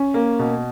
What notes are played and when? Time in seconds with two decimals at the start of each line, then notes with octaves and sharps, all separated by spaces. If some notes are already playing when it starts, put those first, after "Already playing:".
Already playing: C#4
0.14 A#3
0.39 B2